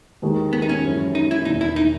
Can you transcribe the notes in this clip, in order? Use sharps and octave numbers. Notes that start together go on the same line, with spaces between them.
D#2 D#3 G#3
B3
D#4
C#4
F#2 E3 G#3 C#4 E4
D#4
E4
E1 E2 D#3 A#3 D#4
E4
D#4